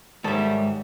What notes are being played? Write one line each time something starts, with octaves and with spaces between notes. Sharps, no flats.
G#2 D#3 G3 A4 C#5 E5